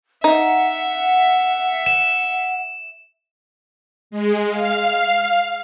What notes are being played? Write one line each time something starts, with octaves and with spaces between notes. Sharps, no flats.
D#4 E5 F#5
E7
G#3
F5